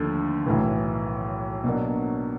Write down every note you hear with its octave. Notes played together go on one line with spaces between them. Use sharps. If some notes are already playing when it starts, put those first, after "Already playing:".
Already playing: D#2 D3 F3 A3
B1 A2 E3
B2 F#3 A#3 D4